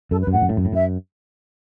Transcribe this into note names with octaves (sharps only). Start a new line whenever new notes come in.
F#2 A4
B4
F#2
A2 F#5
F#2
A2
F#2
A2
F#2 E5